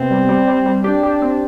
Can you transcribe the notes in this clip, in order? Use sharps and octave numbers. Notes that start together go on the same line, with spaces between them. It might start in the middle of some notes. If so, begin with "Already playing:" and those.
Already playing: C3 B3 C4
G3
G3
G3
G3
D4 G4
G4
C4